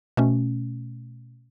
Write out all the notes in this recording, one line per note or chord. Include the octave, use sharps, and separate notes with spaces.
B2 A3 C#4